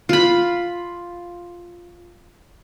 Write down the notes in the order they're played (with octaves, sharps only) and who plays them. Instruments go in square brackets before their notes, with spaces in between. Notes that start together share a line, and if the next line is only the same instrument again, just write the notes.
[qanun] F4 B5